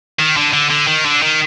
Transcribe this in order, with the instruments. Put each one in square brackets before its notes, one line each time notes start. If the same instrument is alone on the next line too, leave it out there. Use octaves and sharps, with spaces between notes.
[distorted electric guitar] D#3
D3
D3
D3
D#3
D3
D#3